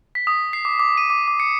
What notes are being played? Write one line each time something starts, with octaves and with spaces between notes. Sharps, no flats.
B6
D#6
C7
D6
D6
D#7
D6
D6
C#7